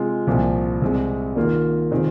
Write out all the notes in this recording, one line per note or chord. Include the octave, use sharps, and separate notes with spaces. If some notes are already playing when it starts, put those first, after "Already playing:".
Already playing: C3 G#3 F4
C2 A#2 F3
C2 C3 G#3
D#3 A#3 F4
C3 D#3 G#3 C4 F4